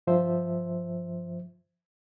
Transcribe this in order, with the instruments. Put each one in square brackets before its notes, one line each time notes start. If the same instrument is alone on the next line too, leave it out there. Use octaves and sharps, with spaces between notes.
[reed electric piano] G2 F3 C5 E5